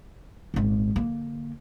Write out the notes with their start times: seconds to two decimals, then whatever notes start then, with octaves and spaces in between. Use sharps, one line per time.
0.54 D#1 G#1
0.96 D3 A#3